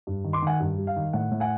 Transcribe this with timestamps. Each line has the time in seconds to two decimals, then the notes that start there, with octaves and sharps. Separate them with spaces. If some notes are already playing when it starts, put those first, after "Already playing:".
0.07 G2
0.24 D#3
0.33 C6 D6
0.42 D#3 F#5 G#5
0.60 G2
0.78 G3
0.87 F5
0.96 D#3
1.13 A2 F#5
1.32 A2
1.40 F#5 G#5